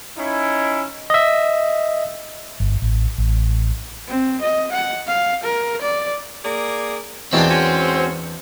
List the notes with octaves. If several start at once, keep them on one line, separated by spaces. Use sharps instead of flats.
C#4 D#4 E4
D#5 E5
G1
A1
A1
C4
D#5
F#5
F5
A#4
D5
A#3 G#4 D5
E2 B2 E3 C4 D4
G#3 C#4 F#4